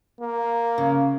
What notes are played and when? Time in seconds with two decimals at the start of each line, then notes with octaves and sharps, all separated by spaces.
0.21 A#3
0.78 C#3